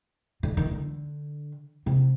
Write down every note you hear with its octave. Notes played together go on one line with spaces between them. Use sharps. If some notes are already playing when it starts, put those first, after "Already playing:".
D3
D#3
D3
C3